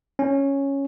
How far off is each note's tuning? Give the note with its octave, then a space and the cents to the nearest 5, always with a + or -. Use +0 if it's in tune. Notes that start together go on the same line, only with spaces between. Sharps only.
C#4 -5